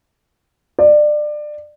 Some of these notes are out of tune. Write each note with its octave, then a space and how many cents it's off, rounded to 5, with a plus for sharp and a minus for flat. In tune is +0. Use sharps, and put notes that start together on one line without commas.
D5 +25